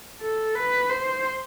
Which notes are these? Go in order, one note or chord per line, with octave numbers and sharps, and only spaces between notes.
A4
B4
C5